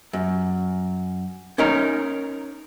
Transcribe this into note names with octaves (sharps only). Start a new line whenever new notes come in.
F#2
C#4 D#4 A#4 C#5 A#5